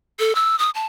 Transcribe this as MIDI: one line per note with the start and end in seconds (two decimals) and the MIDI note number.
0.19 0.35 69
0.35 0.58 88
0.59 0.70 87
0.75 0.87 81